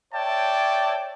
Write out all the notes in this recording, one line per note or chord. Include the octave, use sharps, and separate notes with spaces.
C#5 D5 E5 G5 A5